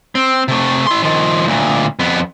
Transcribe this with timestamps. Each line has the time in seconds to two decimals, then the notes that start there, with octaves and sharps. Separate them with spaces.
0.15 C4
0.48 C3 A3
0.87 E4 C6
1.03 D#3 F3
1.47 D2 A#2
1.99 F2 B3